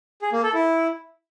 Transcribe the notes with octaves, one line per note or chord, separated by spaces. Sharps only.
G#4
A#3
A4
E4